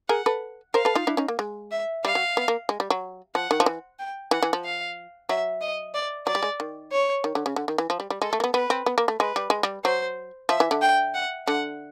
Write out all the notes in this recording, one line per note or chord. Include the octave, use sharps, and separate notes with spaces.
G#4 A#4 F#5
A4 B4
A#4 C5 F5
A4 B4
D#4 F4
D4 E4
C#4 D#4
A#3
G#3
E5
G3 F5
F#3
B3
A#3
G#3
G3
F#3
F3 F#5
D#3
F3
E3
G5
E3 F#5
E3
F3
F5
F#3 E5
D#5
D5
F#3 D5
G3
G#3
D#3
C#5
D#3
D3
C#3
D3
D#3
E3
F3
G3
G3
G#3 A4
A3
A#3
B3
B3 B4
C4
B3
A#3
A3
G#3 B4
G3
G#3
G3
F#3 C5
F3 E5
E3
D3
G5
F#5
D3 F#5